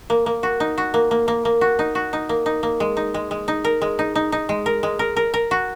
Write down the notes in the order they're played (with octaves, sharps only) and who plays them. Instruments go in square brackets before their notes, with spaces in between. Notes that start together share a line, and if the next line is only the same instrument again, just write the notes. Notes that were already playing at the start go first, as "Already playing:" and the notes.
[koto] A#3
A#3
F#4
D#4
F#4
A#3
A#3
A#3
A#3
F#4
D#4
F#4
D#4
A#3
D#4
A#3
G#3
D#4
G#3
G#3
D#4
A#4
G#3
D#4
D#4
D#4
G#3
A#4
G#3
A#4
A#4
A#4
F#4